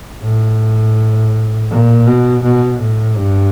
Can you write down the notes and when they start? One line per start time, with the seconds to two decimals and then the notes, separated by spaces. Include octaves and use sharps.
0.23 A2
1.70 A#2
2.07 B2
2.44 B2
2.80 A2
3.17 G2